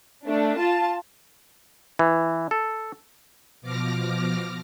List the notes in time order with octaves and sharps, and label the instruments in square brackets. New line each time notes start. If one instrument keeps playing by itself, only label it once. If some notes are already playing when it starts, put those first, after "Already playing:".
[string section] A3 D4
F4 A5
[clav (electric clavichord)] E3
A4
[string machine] B2 F3 D6 F6 A#6